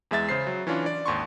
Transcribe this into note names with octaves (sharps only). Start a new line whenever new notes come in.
E2 G#3 E5 A6
C#3 C5 C7
F#3
E3 C#4 D4 F4
D5
G#1 D#2 C6 C#6